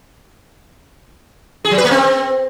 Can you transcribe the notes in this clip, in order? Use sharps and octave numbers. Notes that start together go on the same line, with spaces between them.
G#4
F#3
B4
A#3
C4